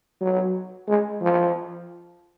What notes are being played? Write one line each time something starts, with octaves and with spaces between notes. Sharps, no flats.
F#3
G#3
F3